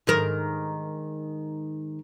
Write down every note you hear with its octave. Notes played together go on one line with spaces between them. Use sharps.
G#2 D#3 A#4